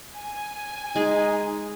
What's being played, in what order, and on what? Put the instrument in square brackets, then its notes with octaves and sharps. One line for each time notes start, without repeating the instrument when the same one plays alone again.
[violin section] G#5
[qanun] G#3 G#4 [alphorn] D#4